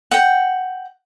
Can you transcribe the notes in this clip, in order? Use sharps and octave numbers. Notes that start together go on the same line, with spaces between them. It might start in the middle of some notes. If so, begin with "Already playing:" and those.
F#5 G5